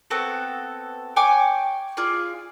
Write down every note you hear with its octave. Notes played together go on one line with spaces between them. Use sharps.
B3 C4 F#4 A4
C#5 G5 G#5 D6
F4 G#4 D5